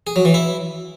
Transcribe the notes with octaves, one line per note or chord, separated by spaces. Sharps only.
G#4
F#3
E3
E4